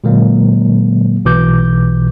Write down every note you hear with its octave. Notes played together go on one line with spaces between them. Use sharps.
A#2 D3 F#3 G#3 A#3
B1 B2 E3 D6 G6